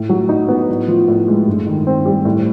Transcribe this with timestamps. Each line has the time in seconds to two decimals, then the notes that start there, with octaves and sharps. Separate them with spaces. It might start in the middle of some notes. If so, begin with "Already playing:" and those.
Already playing: A2
0.09 F#3
0.29 D#4
0.48 B3
0.69 A2
0.88 F3
1.08 A2
1.28 G#3
1.47 G2
1.66 D#3
1.87 C4
2.06 G3
2.25 A2